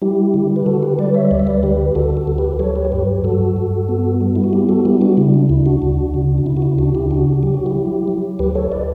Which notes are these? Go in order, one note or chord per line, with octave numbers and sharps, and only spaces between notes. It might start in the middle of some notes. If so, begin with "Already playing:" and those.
G3 E4 G4
D3
B4
D3 F#4 A4
G4 B4
G3 B4 D5
C#5 E5
D2 D5
E5
B4 D5
D3 G4 B4
D2 F#4 A4
F#4 A4
D2
G4 B4
F#3 A4 C#5
G4 B4
C#5
G2 G4 B4
G2 F#4 A4
G2
B3
G3
E4
F#4
B3 E4 G4
F#4 A4
G3 E4 G4
D4 F#4
C#3 E4
D4
D2 E4
D4 F#4
D2
C#3
D4
C#3 E4
F#4
E4
D2 D4 F#4
E4 G4
C#3 D4 F#4
F#3 G4
F#4
E4 G4
F#3
F#3
D2 G4 B4
A4 C#5
B4 D5